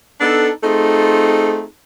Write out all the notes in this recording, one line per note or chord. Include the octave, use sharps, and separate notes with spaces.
B3 D4 D#4 A4
A3 C4 D#4 F4 G#4 A4